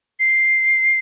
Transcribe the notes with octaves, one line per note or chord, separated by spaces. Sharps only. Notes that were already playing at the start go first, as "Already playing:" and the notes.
C7